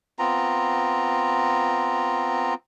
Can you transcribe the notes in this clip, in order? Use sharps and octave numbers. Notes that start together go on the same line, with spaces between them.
B3 C4 F4 A#5